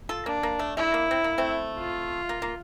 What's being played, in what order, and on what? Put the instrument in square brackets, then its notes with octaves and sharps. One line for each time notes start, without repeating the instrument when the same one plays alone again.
[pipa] F4 A4
[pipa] A#3 [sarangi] D4
[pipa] A#3
A3
[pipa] A3 [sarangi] E4
[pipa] A#3
C4
A#3
A3 C4
[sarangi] F4
[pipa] A#3
A#3